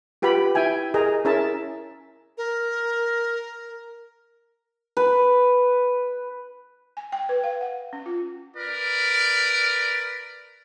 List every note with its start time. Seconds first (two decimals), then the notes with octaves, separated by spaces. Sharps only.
0.22 F4 G4 B4 F#5 B5
0.55 E4 E5 G5 G#5
0.94 G#4 A#4 D#5 A#5
1.25 C#4 E4 G#4 A#4 E5 A5
2.38 A#4
4.97 B4
6.97 G#5
7.12 G5
7.29 B4
7.44 F5
7.61 F#5
7.93 C#4
8.06 F4
8.56 A#4 B4 D5